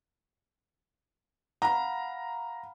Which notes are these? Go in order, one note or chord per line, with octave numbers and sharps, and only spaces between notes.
F5 F#5 A#5 B5